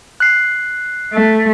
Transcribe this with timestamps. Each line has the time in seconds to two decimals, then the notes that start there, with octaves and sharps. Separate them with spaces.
0.20 F#6 C7
1.13 A3